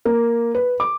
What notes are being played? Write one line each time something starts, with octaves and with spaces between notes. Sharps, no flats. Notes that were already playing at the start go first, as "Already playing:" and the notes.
A#3
B4
D6